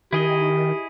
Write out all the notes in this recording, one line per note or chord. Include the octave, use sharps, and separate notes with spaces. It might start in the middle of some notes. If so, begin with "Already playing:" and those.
D#3 E4 G4 G#4 D#5